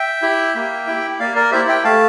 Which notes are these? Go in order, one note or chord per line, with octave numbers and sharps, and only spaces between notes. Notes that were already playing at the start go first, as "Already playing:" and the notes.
Already playing: E5 G5
E4 G4
A#3
E4 G4
A#3 D5 F5
A#4 D5
E4 G4 C5 E5
E5 G5
A3 F5 A5